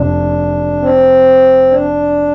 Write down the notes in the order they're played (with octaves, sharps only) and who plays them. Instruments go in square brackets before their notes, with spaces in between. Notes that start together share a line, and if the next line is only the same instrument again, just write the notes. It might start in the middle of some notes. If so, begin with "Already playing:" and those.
Already playing: [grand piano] F1 [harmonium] D4
[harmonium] C4
D4